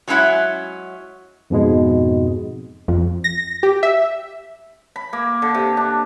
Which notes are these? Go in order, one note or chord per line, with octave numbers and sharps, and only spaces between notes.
F#3 G#3 C#4 E4 E5 F#5
F2 G#2 B2 G#3
F2
A#6
G4
E5
B5
A#3
D3
C3
D4